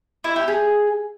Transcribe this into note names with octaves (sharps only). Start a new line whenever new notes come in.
E4
G4
G#4